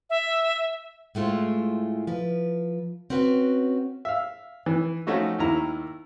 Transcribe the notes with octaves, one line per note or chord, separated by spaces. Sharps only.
E5
A2 G#3 A3 F4 C5
F3 B4
C4 C#4 F#4 B4
E5 F5
E3
F3 A3 C#4 D#4 F#4
D#2 D#3 E4 A#5